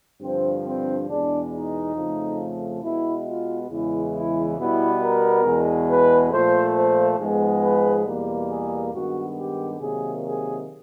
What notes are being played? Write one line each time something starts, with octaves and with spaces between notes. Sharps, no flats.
G2 D3 F3 C4
C4
E2 B2 G#3 B3 D4
D#4
F2 C#3 F3 A3
B2 G#3 B3 E4
F4
E2 C#3 E3 G#3 E4
E4
B2 G3 B3 E4
A#4
E2 B2 G#3 B3
B4
A#2 F3 A3 C5
C5
G#2 F3 G#3 B3
B4
E2 B2 G3 A#3
G#4
G2 D#3 G#3 B3 F#4
G4
C3 D#3 F#3 A#3 G#4
G#4